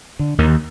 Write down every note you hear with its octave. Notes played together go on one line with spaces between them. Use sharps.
D3
D#2 D#3